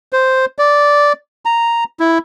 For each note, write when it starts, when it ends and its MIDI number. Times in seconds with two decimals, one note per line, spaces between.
0.13 0.45 72
0.59 1.13 74
1.45 1.84 82
2.00 2.18 64